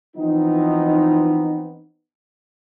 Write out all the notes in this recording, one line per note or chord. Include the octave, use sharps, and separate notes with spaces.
E3 F3 B3 C4 D#4